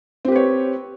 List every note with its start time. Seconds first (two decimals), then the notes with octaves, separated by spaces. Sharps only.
0.25 C4
0.28 G4
0.32 B4
0.36 C#5